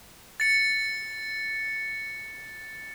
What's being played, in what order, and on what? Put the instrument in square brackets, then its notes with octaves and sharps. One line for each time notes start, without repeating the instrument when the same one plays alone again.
[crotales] A6 C#7